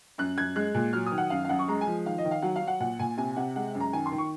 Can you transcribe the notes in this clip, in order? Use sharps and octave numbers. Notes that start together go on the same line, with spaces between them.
F#2 F#6
F#2 G#6
G#3 F#6
A#2
F#3 F6
D#6
D#3
F#5
F#2 F5
F5
F#2 F#5
C#6
G#3 A#5
G#5
F3
D#3 F5
D#5
D#3
F5
F#3 F#5
F5
F#3
F#5
A#2 F#5
A#2 G#5
C3 G#5
C3 F#5
G#3 F#5
F#2
A#5
D#3 G#5
C6
D#3
C#6